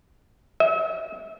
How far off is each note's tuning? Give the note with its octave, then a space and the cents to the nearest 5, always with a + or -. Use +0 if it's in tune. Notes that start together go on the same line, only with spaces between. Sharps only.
E5 -40